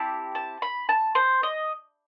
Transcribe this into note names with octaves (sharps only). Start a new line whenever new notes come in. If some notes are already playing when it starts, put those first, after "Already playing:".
Already playing: C4 E4 G4 A5
A5
B5
A5
C5
D#5